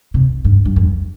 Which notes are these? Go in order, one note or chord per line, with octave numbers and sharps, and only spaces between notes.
C3
G2
G2
F2